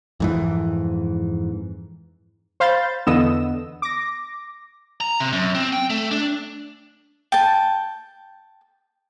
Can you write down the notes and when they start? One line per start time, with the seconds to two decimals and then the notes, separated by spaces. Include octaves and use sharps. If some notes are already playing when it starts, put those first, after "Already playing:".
0.20 F2 G#2 E3
2.60 C5 F5 B5 G6 A6
3.07 E2 D3 B3 D#5 E6 E7
3.82 D6 A#6
5.01 A#5
5.20 C3
5.33 F#2
5.55 C4
5.73 G5
5.90 A3
6.11 D4
7.32 G5 A5